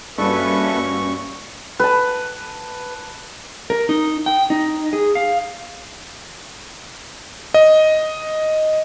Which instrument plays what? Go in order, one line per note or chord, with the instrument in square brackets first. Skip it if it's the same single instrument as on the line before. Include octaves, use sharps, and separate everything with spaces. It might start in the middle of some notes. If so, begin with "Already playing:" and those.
[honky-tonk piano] G2 [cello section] A#3 C#4 F#4 [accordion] A4 B4 E5 [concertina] C#6
[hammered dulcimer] B4 A5
[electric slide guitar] A#4
D#4
G5
D#4
G#4
F5
[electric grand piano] D#5